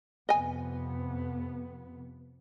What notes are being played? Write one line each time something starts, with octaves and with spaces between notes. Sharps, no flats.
F2 C3 B3 D#5 G#5